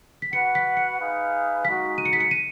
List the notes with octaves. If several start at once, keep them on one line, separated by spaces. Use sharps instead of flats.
B6
F#4 B4 F#5 C#7
B6
C#7
D#4 G#4 B4 F5
G#3 D#4 F#4 B6
D#7
C#7
B6
C#7
D#7